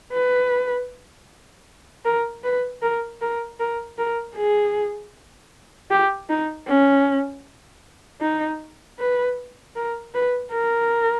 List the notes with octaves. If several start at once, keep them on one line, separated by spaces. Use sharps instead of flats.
B4
A#4
B4
A#4
A#4
A#4
A#4
G#4
G4
D#4
C#4
D#4
B4
A#4
B4
A#4